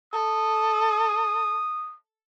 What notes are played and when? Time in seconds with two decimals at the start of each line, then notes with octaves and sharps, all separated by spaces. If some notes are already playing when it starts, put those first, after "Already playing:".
0.13 A4 D#6